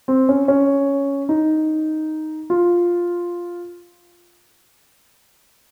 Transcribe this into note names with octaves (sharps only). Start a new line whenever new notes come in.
C4
C#4
C#4
D#4
F4